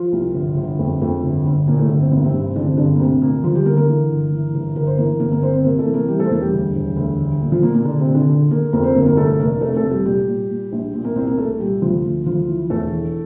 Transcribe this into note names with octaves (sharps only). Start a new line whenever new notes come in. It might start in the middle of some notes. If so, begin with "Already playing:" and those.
Already playing: F3 F4
C2
G1
G1
F2
F2
G1
G1
G1 A#2 A#3
A2 A3
G1
C4
A1 A#3
C3 C4
G2
C4
A1 D3 D4
C4
G2 D3 D4
A#3
D2 C3 C4
D2 A#2 A#3
D3 F3 F4
G3 G4
D3 A#3 A#4
A#3 A#4
E3
G1
E3
G1
G1 A#4
C5
E3 A#3 A#4
G1 A#3 A#4
A#3 A#4
G1 C4 C5
C4 C5
C3 A#3 A#4
A3 A4
E3
A#3 A#4
E3 G3 G4
A3 A4
C5
E1 A#3 A#4
G3 G4
D2
E1
D2
D3
A#2
F3 F4
A#2 A#3
A#2 A#3
A#2 D3 D4
C3 C4
A#2
D3 D4
D3
D3 A#3 A#4
F2 A#3 A#4
C4 C5
G1 A#3 A#4
A#3 A#4
F1 A3 A4
F1 A#3 A#4
C3 A3 A4
A3 A4
F1
G3 G4
A#2 G3 G4
A#2
A#2
A#1
A#2
A#3 A#4
C2 C4 C5
A#3 A#4
C2 A3 A4
A#2 G3 G4
D2 F3 F4
D2
D2 F3 F4
E3
E1 A3 A4
E3